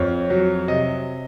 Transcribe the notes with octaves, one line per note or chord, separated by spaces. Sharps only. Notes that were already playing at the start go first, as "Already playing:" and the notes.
Already playing: F2 C#5
F#3
C3 D#5